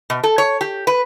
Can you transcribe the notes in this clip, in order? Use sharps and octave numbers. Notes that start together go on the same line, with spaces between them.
B2
A4
C#5
G4
B4